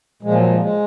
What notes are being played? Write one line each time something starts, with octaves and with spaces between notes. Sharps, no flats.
A#2 F3 G#3
F#3
G#3
G#3